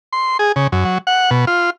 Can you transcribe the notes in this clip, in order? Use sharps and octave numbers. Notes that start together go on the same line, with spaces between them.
C6
G#4
C#3
F#2
F#3
F#5
B2
F4